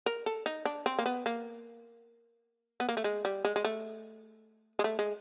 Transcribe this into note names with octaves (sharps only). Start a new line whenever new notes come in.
A#4
A4
D#4
D4
C4
A#3
B3
A#3
B3
A#3
A3
G#3
G3
G#3
G#3
A3
G#3
A3
G#3